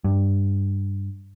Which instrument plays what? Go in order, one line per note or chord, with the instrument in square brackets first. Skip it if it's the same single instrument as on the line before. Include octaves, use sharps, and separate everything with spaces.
[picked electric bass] G2